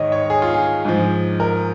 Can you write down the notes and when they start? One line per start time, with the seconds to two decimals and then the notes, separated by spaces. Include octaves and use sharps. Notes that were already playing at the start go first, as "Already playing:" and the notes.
Already playing: G#2 D#3 C#5 D#5
0.12 C#5
0.30 G#4
0.42 F4
0.54 G#4
0.85 G#2 F3
1.40 A#4